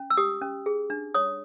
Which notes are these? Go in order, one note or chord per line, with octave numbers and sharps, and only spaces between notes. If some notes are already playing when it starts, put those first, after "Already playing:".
Already playing: C#4
E6
G4 D#6
C#4
G#4
D4
C#5 D#6